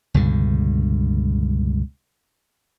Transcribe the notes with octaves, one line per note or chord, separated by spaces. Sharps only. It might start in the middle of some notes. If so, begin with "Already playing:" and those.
C#2 G2 B2 D3